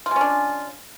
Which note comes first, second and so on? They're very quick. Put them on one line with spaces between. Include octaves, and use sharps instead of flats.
F4 G#3 C#4 D4